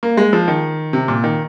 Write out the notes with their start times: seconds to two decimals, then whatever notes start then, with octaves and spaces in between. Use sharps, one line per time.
0.03 A#3
0.17 G#3
0.33 F3
0.48 D#3
0.93 C3
1.08 A#2
1.24 D#3